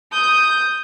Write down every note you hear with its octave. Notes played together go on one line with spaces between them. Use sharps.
D#6 G6